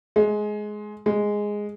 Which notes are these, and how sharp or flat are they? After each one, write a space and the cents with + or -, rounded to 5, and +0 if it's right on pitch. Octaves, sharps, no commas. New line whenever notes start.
G#3 +15
G#3 -5